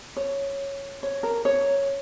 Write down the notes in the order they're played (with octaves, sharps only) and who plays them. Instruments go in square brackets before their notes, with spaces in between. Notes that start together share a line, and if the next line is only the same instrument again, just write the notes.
[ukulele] C#5
C#5
A#4
C#5